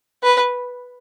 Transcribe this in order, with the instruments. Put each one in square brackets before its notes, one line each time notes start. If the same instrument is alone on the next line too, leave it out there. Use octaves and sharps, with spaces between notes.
[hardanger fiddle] B4